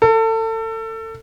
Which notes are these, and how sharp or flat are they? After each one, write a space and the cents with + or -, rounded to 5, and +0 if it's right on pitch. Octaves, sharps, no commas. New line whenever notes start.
A4 +30